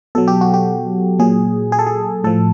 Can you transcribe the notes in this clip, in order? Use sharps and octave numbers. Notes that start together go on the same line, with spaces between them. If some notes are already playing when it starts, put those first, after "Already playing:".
B2 F#3 A4
G4
F#4
G4
A#2 F#3 G#4
G#4
A4
G#4
A2 F3 A4